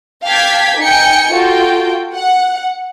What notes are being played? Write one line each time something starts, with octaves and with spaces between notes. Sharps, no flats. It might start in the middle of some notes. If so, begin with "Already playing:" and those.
F5 G5 A5 D6 G#6 B6
D#4 G5 G#5 C#7
F4 F#4 A4 G5
F#5